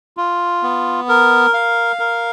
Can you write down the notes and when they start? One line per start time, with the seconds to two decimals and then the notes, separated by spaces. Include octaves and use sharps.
0.17 F4
0.63 B3
1.09 A#4
1.54 F5
1.99 A#4